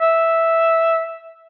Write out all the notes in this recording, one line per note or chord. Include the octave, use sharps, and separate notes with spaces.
E5